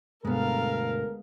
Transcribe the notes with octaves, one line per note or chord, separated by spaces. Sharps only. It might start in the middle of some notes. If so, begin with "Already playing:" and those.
D2 G2 B2 G#3 B3 A4 A#4 F5